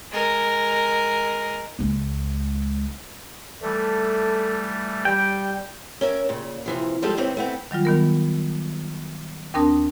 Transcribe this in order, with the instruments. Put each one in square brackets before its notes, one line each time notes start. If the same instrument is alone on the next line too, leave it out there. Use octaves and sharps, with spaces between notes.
[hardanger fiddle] G#3 A#4
[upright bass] C#2 G#3
[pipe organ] E3 G3 A3 [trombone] A4
[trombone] G3 [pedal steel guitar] G5
[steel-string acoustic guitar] C#4 A#4 E5
A#2 C#3
C3 E3 F3
F3 G3 G#3 F4 A4
D#2 G#2 E3 C4 C#4
A3 B3 C4
[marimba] D#3 F#3 G3 F4
D#3 B3 A#4
D#2 C4 D4 A#4 A5 D#6